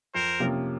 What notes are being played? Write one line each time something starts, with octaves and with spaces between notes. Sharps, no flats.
F2 A#4 C5
C3 F3 A#3 C#4